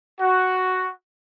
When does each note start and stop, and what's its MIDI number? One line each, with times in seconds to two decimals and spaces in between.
0.20 0.91 66